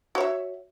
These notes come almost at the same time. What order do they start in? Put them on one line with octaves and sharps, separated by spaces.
F#4 C#5 E5